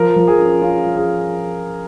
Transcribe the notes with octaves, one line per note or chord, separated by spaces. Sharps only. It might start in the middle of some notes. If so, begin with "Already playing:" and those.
Already playing: F3 A#4
F3
G#4
C#4
C#4 F4
F3
G#4